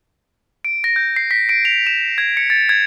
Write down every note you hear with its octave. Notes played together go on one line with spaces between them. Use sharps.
D7
A#6
G6
C7
B6
D7
F7
E7
G#6
C#7
A6
G#6